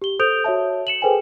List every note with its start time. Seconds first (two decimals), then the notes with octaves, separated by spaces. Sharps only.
0.02 G4 G7
0.19 A4 C5 D#6 G6 D7 F7
0.44 F#4 C#5 E5 A5
0.87 C#7 E7 F#7
1.02 G#4 A4 B4 C5 G5 G#5